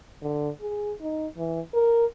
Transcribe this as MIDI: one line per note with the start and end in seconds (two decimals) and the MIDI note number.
0.22 0.49 50
0.61 0.92 68
1.01 1.27 63
1.37 1.60 52
1.74 2.05 70